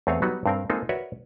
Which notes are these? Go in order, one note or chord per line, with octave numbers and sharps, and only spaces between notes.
E2 A3 C4 G#4 C#5 F5
F#3 G3 B3 D#4 F#4
G2 C4 A#4
G#3 A#3 C4 D#4 F4 A4
F#4 A#4 B4 C#5 D5 E5